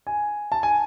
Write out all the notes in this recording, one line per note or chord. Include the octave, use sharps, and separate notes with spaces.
G#5
A5
G#5